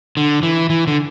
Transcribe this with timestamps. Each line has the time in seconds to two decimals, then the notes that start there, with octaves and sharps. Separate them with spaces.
0.17 D3
0.43 E3
0.70 E3
0.87 D3